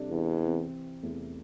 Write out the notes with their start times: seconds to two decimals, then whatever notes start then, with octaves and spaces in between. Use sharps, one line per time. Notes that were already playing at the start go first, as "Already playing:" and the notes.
Already playing: C3 G3 D4 A4 D5
0.10 E2
0.42 C3 E3 C4
1.03 E2 C3 E3 A3 E4